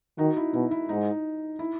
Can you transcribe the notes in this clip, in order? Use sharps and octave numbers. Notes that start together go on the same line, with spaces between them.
D#3 D#4 F#4
E4
B2 E4
E4
G#2 D#4
E4